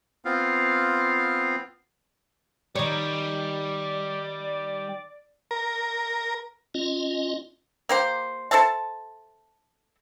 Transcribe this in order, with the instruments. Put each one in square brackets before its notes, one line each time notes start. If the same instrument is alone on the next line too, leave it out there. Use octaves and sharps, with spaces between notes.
[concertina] B3 C4 F4 F5
[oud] D#3 C#5 [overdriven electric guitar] G3 [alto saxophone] D5
[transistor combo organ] A#4
[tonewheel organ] C#4 F4 D#5
[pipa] A#3 G4 C5
A4 C5 E5 A5